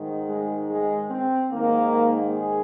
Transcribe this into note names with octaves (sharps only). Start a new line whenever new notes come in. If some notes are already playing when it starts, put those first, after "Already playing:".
Already playing: G#2 D#3
G#3
G#3
C4
G#2 D#3 A#3
G#4